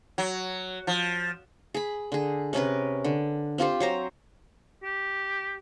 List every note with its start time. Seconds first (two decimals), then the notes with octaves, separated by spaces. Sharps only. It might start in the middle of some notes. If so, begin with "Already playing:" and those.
0.18 F#3
0.87 F3
1.74 G#4 B5
2.12 D3 G#4
2.53 C3 C#4 A#4 B4
3.04 D3
3.58 C4 F4 G4 C5
3.80 F#3 C5 A#5
4.83 G4